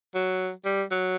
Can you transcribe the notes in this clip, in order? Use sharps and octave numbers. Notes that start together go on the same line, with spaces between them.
F#3
G3
F#3